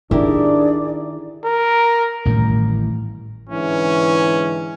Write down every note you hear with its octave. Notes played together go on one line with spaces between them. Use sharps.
D#3 D4 E4 G4 G#4 A#4 D5 D6
A#4
A1 A2 D#3 G3
G#2 D3 E3 C#4